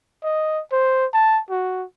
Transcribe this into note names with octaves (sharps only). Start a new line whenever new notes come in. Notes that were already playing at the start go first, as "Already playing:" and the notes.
D#5
C5
A5
F#4